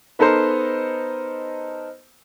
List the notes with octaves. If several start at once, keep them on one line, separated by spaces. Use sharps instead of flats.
B3 D#4 A4 A#4 C5